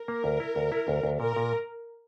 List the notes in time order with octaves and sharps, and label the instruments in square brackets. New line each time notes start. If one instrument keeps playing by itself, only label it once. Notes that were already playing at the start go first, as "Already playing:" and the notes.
Already playing: [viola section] A#4
[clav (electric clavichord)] A#3
D2
E4
D2
E4
D2
D2
[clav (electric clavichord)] A#2 [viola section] A#4
[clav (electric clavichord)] A#2